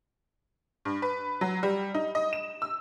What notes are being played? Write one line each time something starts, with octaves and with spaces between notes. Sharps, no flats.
G2
B4
F#3
G3
D#4
D#5
E7
E6